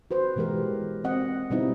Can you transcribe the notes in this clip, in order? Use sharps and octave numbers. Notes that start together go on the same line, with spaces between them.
F#4 B4 C5
B2 E3 G#3 G4 A#4
C4 D#5 F#5
B2 G3 B3 C4 D#4 E4